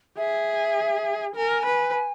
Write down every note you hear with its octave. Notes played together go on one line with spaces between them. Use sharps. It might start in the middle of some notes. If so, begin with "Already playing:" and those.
G#4 E5
A#4 G#5
B4